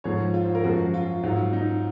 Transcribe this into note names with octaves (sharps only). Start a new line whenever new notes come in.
G#2 F3 G#3 C#5
F4
C5
A#4
F#2 F3 G#3 F#4
F4
G#2 F#3
D#4